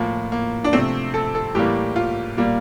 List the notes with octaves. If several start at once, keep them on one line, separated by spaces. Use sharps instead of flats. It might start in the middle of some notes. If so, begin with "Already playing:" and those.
Already playing: A2 F3 A#3
A#3
D4
C3 F3 A3 C4
A4
A4
A2 E3 G3 A#3 G4
F4
A#2 G3 A#3